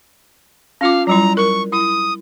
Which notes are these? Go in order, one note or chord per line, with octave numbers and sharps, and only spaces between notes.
C#4 F4 F5 D6
F#3 G3 E4 A#5
A#4 C#6
E4 D#6